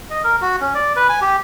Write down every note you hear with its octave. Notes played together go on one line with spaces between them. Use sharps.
D#5
A#4
F#4
C#4
D5
B4
G#5
G4